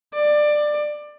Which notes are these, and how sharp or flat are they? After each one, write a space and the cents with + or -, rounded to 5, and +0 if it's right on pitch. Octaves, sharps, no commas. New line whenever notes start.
D5 +20